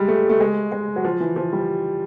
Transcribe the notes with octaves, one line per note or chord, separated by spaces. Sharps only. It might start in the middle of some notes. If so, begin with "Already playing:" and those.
Already playing: G3 G#3
A3
A3
G#3
G#3
F#3
F3
E3
F3
G3